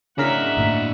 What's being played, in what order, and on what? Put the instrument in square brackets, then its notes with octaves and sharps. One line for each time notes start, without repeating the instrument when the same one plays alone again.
[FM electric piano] C#3 A#4 B6 [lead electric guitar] D4 E4 [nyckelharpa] E5 F#5
[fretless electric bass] G1 A2 A#3